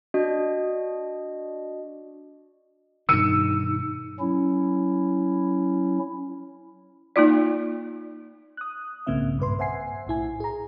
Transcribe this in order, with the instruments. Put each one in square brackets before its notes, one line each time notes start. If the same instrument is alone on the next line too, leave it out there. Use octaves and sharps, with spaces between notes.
[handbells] D4 F#4 D5 D#5
[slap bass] G2 B2 D#3 [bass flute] D#4 [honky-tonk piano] E6 C#7 D#7
[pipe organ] F#3 C#4 E4
[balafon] A#3 D#4 F4 D5
[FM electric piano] D#6 F#6
B1 G#2 C#3 A#3 C4 E5
G2 A#2 B4 C6
C5 E5 F#5 G#5 C7
B1 A2 E4 G#5
G#4 A#5